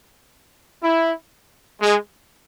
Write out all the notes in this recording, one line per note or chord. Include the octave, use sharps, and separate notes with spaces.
E4
G#3